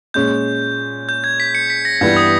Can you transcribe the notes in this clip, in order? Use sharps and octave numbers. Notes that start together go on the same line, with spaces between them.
A#2 G#3 C#4 G6
G6
G#6
B6
C#7
B6
A#6
G2 E3 G3 B3 E4 G#6
D#6